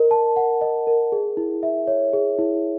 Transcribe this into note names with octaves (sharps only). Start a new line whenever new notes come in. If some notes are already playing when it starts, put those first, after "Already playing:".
Already playing: A#4 D#5
A5
F#5
D#5
A#4
G#4
E4
E5
C#5
G#4
E4